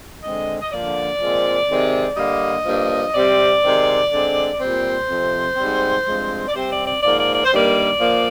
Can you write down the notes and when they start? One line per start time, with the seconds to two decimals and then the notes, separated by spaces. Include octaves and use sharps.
0.22 D3 G#3 C4 D#5
0.60 D#5
0.71 D3 F3 A#3 D5
1.20 A#2 F3 G#3 C4
1.68 C3 D#3 G#3 C4
2.16 D3 G3 A#3 D#5
2.65 G2 F3 A#3
3.14 C3 G3 C4 D5
3.62 C3 D#3 G#3 C4
4.11 D3 G#3 C4
4.59 A#2 G3 C4 C5
5.08 F2 C3 F3 C4
5.56 G#2 G3 C4
6.05 G2 F3 G#3 C4
6.47 D5
6.53 C3 G3 C4 C5
6.70 D5
6.86 D5
7.02 G#2 F3 A#3 D5
7.18 D5
7.34 D5
7.44 C5
7.51 G2 D#3 G3 A#3 D5
7.99 A#2 F3 A#3